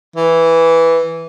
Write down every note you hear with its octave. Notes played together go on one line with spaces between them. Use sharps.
E3